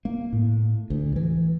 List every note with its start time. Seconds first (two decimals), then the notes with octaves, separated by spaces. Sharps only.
0.05 A#3
0.33 A2
0.90 D2
1.16 E3